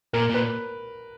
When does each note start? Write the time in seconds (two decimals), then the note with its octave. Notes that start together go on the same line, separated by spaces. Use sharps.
0.13 A#2 A#4
0.30 A#2 B4